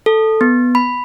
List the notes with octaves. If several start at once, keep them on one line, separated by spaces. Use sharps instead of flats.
A4
B3
B5